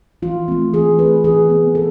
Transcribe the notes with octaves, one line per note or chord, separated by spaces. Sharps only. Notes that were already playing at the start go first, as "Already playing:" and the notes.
E3 F4
A3 C4
E3 G#4
A3 C4 B4
E3 G#4
B3
E3 A4